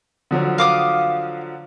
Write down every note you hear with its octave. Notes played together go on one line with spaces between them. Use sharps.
D3 F3 F#3
F5 D6 D#6